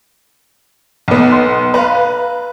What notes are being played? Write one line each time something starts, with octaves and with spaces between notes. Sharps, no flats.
B1 B3
C6
B4 F5 A#5